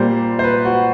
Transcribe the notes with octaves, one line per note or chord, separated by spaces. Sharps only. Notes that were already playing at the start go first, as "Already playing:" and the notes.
Already playing: A#2 G3 A#3 C5
C5
B4
F#4